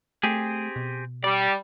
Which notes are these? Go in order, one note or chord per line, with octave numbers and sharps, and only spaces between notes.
A3 C4 G4 G#4
B2
G3 D5